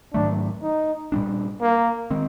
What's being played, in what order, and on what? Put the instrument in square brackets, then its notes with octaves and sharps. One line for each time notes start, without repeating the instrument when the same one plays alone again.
[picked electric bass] G#2 D#3 F#3 A3 [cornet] D4
[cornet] D#4
[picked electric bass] A#2 G3 B3 D4
[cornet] A#3
[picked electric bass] D#3 G#3 C4